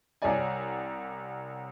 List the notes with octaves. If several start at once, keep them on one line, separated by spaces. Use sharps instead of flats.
C2 G3 C#4 D5 G#5